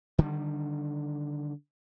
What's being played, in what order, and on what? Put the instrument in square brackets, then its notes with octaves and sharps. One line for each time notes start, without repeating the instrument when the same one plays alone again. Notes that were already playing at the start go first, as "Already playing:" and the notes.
[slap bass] D3 D#3 G3